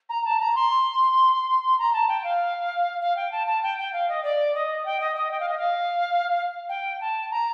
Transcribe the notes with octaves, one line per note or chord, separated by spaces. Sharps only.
A#5
A5
A#5
C6
A#5
A5
G5
F5
F5
G5
A5
A5
G5
G5
F5
D#5
D5
D#5
G5
D#5
D#5
G5
F5
D#5
F5
G5
A5
A#5